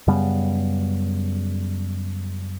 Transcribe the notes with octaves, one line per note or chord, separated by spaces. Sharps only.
F#2 C#3 G3 B3